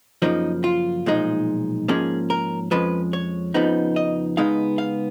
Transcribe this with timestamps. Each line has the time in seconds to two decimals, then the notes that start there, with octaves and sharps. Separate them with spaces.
0.22 F#2 C#3 F3 A#3 D#4
0.64 F4
1.06 B1 A#2 F3 G#3 D#4
1.88 G#2 F3 A#3 C#4 G#4
2.30 A#4
2.71 F2 F3 G#3 C#4 B4
3.13 C#5
3.54 F2 C#3 F3 B3 D#4
3.96 D#5
4.37 C#2 C#3 G#3 B3 D#4 F5
4.78 F5